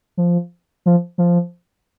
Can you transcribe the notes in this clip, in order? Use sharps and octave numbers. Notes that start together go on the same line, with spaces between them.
F3
F3
F3